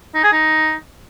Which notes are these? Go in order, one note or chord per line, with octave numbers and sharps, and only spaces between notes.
D#4
G#4
D#4